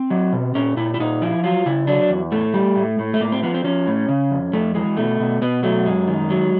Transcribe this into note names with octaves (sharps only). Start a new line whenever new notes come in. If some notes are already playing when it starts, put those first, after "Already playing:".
Already playing: C4
F#3
B2
A#2 C#4
A#2 E4
E4
A#2 D#4
F3 E4
F#3 F4
C#3 E4
F#3 D4
E2
A2 A3
G3
A2
A2
A3
A2 A#3
C4
F3 B3
C4
F3 C#4
A2
C#3
F2
F2 A3
E3 G#3
B2 A3
B2
B2 B3
F#3 A3
F#2 G#3
D#3
F#3